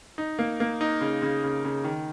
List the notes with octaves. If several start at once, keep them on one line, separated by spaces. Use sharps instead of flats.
D#4
A#3
A#3
D#4
C#3
C#3
C#3
C#3
D#3